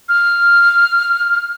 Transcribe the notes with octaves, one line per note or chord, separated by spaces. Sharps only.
F6